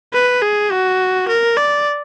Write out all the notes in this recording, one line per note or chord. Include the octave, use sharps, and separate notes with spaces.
B4
G#4
F#4
A#4
D5